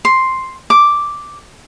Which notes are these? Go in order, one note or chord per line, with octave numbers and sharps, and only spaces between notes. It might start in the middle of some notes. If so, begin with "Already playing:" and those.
C6
D6